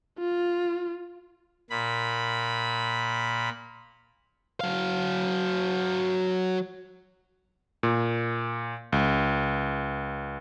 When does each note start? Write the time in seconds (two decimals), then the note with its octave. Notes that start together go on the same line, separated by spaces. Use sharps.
0.19 F4
1.70 A#2 B5
4.61 F#3 F5
7.83 A#2
8.92 C#2